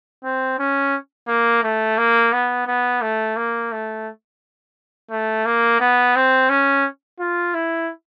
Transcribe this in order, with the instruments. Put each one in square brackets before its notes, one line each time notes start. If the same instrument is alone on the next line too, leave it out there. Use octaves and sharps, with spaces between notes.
[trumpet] C4
C#4
A#3
A3
A#3
B3
B3
A3
A#3
A3
A3
A#3
B3
C4
C#4
F4
E4